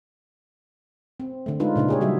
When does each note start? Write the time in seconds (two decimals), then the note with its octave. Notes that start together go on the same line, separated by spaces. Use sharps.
1.20 C4
1.46 D3 A3
1.60 G#3 D4 D#4 F4 B4
1.76 A#2 C#3 D4 D#4
1.88 G4 G#4 C#5
2.01 C#3 F#3 G3 F#4 E5